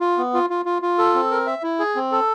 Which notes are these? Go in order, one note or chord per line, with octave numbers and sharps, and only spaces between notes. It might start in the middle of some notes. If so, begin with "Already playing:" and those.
F4
B3
F4
F4
F4
F4
A4
C4
A#4
E5
E4
G#4
C4
A4